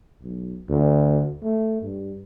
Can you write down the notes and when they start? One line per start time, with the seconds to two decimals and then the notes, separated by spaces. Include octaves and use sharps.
0.22 B1
0.69 D2
1.43 A3
1.81 G2